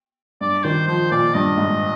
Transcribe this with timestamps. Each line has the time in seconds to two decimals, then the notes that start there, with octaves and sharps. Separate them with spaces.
0.41 G2 D5
0.64 D#3 C5
0.87 F3 C5
1.11 A#2 D5
1.34 G2 D#5
1.58 G#2